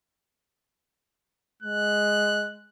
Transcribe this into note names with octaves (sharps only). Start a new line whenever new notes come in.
G#3 F#6